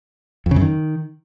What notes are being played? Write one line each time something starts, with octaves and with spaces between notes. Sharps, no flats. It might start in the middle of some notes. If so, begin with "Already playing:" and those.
F2
C#3
F#2
D#3